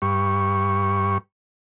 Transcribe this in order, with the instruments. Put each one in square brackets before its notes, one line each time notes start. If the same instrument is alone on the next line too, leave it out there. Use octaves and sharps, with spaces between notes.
[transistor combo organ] G2 C#6